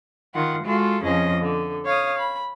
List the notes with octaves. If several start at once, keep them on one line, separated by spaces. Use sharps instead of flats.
D#3 F4 F#5
G#3 F4 F#4 A4
F2 C#3 F3 C#4 D#5
D3
C#5 F5 D#6
B5